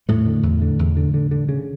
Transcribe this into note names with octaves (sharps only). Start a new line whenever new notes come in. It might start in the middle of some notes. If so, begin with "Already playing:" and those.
E2 A2 A3
D3
E2
D3
E2
D3
D3
D3
C#3